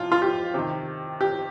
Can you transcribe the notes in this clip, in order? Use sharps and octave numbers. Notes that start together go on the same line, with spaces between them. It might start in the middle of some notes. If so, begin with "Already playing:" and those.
Already playing: C3 F3 F4
F4
G4
C3 D#3
G4